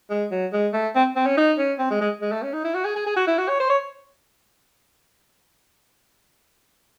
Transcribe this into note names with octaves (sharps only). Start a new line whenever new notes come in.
G#3
F#3
G#3
A3
C4
C4
C#4
D#4
C#4
C4
G#3
G#3
G#3
A3
C#4
D#4
E4
F#4
G#4
G#4
G#4
F#4
E4
F#4
C#5
C5
C#5